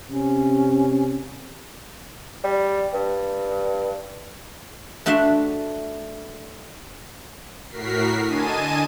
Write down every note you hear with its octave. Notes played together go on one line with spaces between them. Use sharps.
C3 C#4
G3
G2
A3 D4 F#4 E5 C6
A2 F#4 A#4 B6 C7
D3 D#5 G#5 A5 D#7